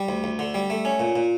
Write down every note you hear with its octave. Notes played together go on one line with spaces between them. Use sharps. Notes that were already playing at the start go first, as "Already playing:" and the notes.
Already playing: G3
D2
D2
D3
G3
A3
C#4
A#2
A#2